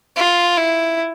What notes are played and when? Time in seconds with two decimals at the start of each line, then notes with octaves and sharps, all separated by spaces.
0.17 F4
0.57 E4